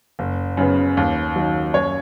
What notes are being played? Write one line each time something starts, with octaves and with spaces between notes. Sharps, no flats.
F#1
F#2 C#3 B3
D#2
D#3 F#3
F#2 C#5